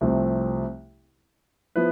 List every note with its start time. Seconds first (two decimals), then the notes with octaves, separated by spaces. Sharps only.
0.01 C2 C3 F3 A3 C4
1.76 F3 B3 E4 B4